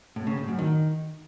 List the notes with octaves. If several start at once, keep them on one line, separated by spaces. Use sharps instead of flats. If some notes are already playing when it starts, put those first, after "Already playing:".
A2
C#3
A2
F#2
D#3